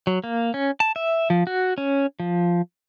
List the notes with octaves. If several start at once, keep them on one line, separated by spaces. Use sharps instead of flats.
F#3
A#3
C#4
A5
E5
F3
F#4
C#4
F3